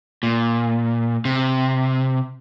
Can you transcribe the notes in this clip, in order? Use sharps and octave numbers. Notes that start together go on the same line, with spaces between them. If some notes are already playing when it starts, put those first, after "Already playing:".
A#2
C3